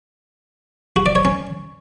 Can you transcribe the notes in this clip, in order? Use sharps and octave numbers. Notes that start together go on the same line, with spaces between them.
F#4
D5
C#5
C#4